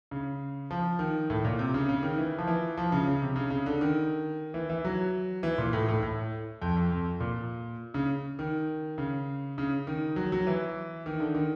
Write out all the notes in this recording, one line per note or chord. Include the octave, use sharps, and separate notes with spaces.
C#3
F3
D#3
A2
A#2
C3
C#3
C#3
D#3
E3
F3
E3
F3
C#3
C#3
C3
C#3
C#3
D3
D#3
E3
E3
F#3
E3
A#2
A2
A2
A2
F2
F2
F2
A#2
C#3
D#3
C#3
C#3
D#3
F#3
F#3
E3
D#3
D3
D#3